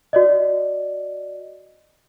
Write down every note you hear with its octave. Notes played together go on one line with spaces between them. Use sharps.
F#4 D5 D#5